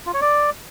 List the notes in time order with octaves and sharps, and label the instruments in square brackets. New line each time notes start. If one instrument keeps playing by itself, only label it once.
[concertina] F4
C#5
D5